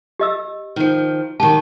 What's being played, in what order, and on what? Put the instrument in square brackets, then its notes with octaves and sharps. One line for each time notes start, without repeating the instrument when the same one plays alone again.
[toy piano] G4 D#5 E6
[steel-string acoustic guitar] D#3 F3
[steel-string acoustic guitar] D#3 F#3 G4 [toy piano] A5